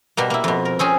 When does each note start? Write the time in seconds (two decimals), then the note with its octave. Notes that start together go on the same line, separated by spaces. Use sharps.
0.17 B2 G3 A#3
0.30 A#3 E4
0.44 F2 B2
0.65 A#4
0.79 C4 C#4 G#4